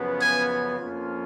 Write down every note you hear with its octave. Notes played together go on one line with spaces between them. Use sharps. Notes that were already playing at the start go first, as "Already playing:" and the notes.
Already playing: F#2 C#3 F3 B3
G#5
F2 F3 A#3 C#4 F4